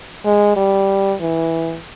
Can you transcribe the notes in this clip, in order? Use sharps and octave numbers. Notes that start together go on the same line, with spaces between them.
G#3
G3
E3